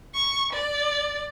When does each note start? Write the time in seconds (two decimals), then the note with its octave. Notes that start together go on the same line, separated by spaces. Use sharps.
0.15 C#6
0.53 D5